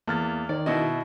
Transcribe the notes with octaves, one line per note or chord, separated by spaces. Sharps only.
E2 A#3 F6 A6
D#3 D5
B2 E4 D#5